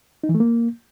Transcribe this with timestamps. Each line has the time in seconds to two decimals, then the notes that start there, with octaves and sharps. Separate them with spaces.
0.24 D#4
0.29 E3
0.35 A3
0.40 A#3